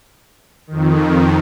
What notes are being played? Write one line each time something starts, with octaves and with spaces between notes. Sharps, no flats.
F2 D#3